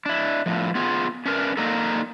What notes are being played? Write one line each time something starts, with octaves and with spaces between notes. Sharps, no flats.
D4 E4
A2 F3
B3 F4 G#4
C#4 D4 A#4 B4
A#3 D4 D#4 F4 A4 A#4